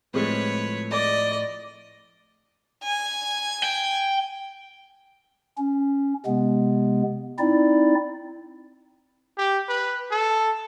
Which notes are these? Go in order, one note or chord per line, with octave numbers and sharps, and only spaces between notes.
A2 F3 G#3 A3 C4 B4 C#5
D5 D#5
G#5
G5
C#4
C3 G#3 B3
C4 D#4 E4 D5
G4
B4
A4